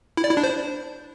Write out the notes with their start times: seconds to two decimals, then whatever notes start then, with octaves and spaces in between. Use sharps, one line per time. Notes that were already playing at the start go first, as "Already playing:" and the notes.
0.17 E4
0.24 D5
0.30 E4
0.37 D4
0.44 C5